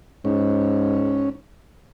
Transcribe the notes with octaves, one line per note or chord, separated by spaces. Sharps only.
G#2 C#4